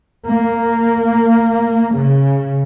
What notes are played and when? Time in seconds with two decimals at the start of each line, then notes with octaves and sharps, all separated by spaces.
0.28 A#3
1.94 C#3